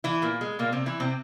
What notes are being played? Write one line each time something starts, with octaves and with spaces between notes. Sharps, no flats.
E3 E4
A#2 A#3
G#3
A#2 A#3
C3 C4
E3 E4
C3 C4